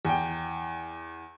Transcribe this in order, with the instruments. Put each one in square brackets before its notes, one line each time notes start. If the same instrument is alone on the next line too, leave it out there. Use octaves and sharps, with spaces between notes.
[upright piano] E2 G5